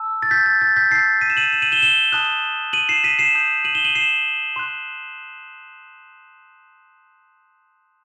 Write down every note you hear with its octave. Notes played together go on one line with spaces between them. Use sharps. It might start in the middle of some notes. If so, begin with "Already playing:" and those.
Already playing: A5 E6
A6
G6 B6
A6
A6
G6 B6
A5 E6 G6 A6 C7
B6 D#7
E7
D#7 F#7
E7
D#7 F#7
E7 G7
E7 G7
A5 D#6 F#6
D#7 F#7
C7 E7
B6 D#7
C7 E7
A5 D#6 G6
D#7 F#7
E7 G7
D#7 F#7
C7 E7
C6 F#6